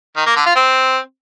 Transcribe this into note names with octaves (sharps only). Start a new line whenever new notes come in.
D#3
A#3
D3
F4
C4